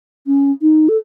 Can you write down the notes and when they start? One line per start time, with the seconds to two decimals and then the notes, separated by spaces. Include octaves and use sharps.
0.27 C#4
0.62 D#4
0.89 A4